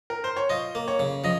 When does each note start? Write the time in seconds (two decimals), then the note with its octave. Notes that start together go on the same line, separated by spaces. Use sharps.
0.10 A#4
0.24 C5
0.36 C#5
0.50 F4 D#5
0.75 A#3
0.88 C#5
1.00 C#3
1.24 F3 D#5